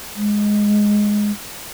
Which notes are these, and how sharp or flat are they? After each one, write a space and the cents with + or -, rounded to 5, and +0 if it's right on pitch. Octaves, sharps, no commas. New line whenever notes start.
G#3 +0